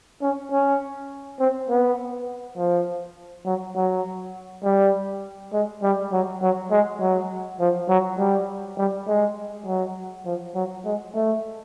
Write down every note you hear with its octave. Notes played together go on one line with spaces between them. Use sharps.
C#4
C#4
C4
B3
F3
F#3
F#3
G3
G#3
G3
F#3
F#3
G#3
F#3
F3
F#3
G3
G3
G#3
F#3
F3
F#3
G#3
A3